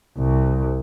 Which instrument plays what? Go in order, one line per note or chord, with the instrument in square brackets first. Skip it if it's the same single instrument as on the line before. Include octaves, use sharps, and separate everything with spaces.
[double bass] C2